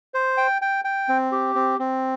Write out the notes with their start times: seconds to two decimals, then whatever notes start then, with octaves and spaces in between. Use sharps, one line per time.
0.14 C5
0.37 G5
0.62 G5
0.85 G5
1.09 C4
1.32 G4
1.55 C4
1.79 C4